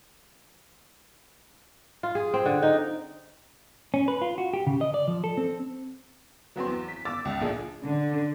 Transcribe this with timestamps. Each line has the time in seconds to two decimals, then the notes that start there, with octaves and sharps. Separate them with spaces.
2.03 F4
2.15 G#4
2.34 C4
2.46 D3
2.62 D#4
3.94 C#4
4.08 B4
4.22 F4
4.38 F#4
4.53 G4
4.67 C#3
4.81 D#5
4.94 D5
5.08 F3
5.24 A4
5.37 C4
6.56 F#3 B3 C4 C6
6.67 E2
6.88 B6
7.05 D6 E6 A6
7.25 C#2
7.41 A#1 F3 D4 G#4
7.85 D3